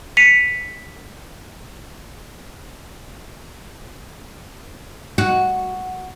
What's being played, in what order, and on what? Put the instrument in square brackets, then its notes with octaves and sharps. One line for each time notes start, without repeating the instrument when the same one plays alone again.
[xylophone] B6 C#7 D#7 F7
[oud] F#4